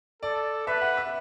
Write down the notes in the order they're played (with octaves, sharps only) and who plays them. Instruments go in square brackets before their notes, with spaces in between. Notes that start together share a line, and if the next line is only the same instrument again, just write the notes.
[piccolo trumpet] A4 [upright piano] D5
[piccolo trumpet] B4 [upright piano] E5
[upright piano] F#5
E5